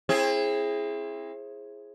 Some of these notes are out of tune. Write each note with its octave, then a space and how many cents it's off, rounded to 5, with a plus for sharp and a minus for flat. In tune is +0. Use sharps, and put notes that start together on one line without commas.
C4 +35 E4 +10 G#4 +5